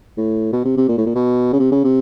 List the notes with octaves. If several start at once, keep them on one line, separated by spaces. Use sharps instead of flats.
A2
B2
C3
C3
A#2
A2
A#2
B2
C#3
C3
C#3
C3